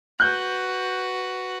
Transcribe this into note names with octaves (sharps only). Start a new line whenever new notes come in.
F#4 B4 F#6 G6